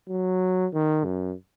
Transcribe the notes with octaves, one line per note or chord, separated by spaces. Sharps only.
F#3
D#3
F#2